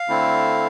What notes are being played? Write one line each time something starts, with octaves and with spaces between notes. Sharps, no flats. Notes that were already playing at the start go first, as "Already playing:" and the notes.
Already playing: F5
D3 A3 C4 E4